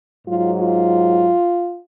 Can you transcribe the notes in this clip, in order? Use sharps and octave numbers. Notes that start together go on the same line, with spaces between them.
G#2 F#3 F4
F4